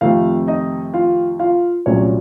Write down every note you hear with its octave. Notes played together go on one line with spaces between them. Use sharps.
F2 C3 D#3 A3 F4 F5
D#4 D#5
F4 F5
F4 F5
C2 A#2 F#3 A3 C#4 C#5